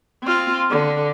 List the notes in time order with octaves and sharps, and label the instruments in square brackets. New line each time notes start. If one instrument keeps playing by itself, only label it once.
[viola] C4 F4
D3